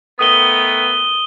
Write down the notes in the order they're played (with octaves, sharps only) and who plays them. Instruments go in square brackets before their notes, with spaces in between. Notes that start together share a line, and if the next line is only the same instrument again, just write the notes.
[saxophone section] D#3 A3 B3 [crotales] D#6 D#7 G7